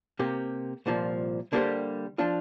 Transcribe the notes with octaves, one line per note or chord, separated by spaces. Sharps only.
C3 A#3 G4
C2 A#2 F3
D3 G3 A#3 G4 C5
F3 D4 F4